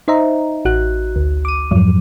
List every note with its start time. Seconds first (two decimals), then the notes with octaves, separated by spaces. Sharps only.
0.08 D#4 C5 D#5 E5 A#5
0.65 A1 F#4 F#6
1.16 D2
1.45 D6 D#7
1.71 F2 G#2 F3 F#3